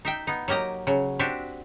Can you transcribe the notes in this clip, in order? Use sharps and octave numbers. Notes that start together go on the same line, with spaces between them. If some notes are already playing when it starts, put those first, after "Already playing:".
D#4 E5 G5
B3 D#4
F#3 A#3 G4 D#5 A#5
C#3 F#3
C4 D4 F#4 G4 E5